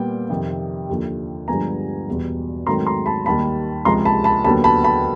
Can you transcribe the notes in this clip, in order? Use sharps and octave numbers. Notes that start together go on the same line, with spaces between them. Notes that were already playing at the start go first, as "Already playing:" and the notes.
Already playing: A#2 G3 B3 G5
F2 C3 D#3
D#2 D3 F3
G2 D3 F3 G#3 B3 G#5 A#5
E2 B2 G3
G#2 D#3 F#3 A3 C4 A#5 C6
A#5 C6
A5 B5
D#2 D#3 G3 A5 B5
C#2 C3 F3 G#3 A#5 C6
A5 B5
A5 B5
D#2 D3 F#3 B3 A5 B5
A5 B5
A5 B5